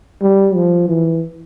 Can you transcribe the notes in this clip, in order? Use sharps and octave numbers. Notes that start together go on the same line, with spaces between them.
G3
F3
E3